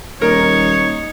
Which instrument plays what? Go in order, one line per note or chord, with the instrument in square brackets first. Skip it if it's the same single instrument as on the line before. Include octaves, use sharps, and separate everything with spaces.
[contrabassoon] D#1 [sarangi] D#4 [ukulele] A#4 [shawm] C#5